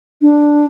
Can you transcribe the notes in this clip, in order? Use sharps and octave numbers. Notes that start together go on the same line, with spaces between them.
D4